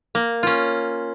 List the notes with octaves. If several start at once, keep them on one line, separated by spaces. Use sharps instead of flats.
A#3
C#4 F4